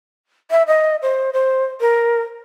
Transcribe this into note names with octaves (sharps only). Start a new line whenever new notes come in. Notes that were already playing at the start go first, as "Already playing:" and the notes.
E5
D#5
C5
C5
A#4